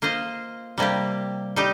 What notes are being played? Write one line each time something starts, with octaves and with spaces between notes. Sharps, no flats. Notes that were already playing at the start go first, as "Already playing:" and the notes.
A#3 F4 C5 D#5
C3 G3 A#3 G4
G3 D#4 G4